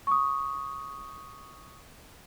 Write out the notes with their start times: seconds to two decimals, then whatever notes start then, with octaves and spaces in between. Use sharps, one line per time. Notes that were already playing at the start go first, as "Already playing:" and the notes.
0.07 C#6 D#6